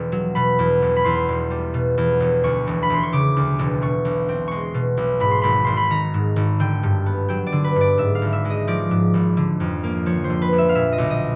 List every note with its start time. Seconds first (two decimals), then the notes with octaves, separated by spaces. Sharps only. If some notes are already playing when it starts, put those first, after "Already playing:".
Already playing: E1
0.12 F#3
0.35 B2 B5
0.59 E2
0.82 E1
0.96 B5
1.04 E2 C6
1.29 E1
1.51 G3
1.74 B2
1.98 E2
2.20 E1
2.43 D2 C#6
2.67 E1
2.83 B5
2.90 E1 C6
3.03 C#6
3.12 C#3 D6
3.37 D2
3.59 E1
3.82 B2 C#6
4.05 B1
4.29 C4
4.48 G#3 C6 C#6
4.74 B2
4.97 B1
5.20 G#2 B5
5.31 C6
5.42 G#1 B5
5.65 G#1 C6
5.77 B5
5.90 D#3 A#5
6.14 G#2
6.36 G#1
6.60 D3 G5
6.83 G2
7.06 B3
7.29 F#3 G5
7.47 D5
7.52 D3
7.64 B4
7.76 G2
7.81 D5
7.98 G#2 E5
8.15 F5
8.22 G#1
8.33 E5
8.45 G#3
8.50 D#5
8.68 F3 D5
8.91 G#2
9.14 G#1
9.37 D3
9.60 F2
9.83 A#3
10.06 F3 C#5
10.24 C5
10.30 D3
10.42 B4
10.53 F2
10.58 E5
10.69 F5
10.75 A#2 E5
10.92 D#5
10.98 B1
11.10 D#5